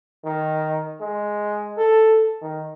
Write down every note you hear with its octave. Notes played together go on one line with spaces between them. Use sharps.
D#3
G#3
A4
D#3